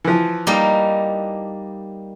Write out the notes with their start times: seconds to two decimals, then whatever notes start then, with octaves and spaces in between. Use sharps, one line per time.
0.04 E3 F3
0.47 G3 A#3 D#4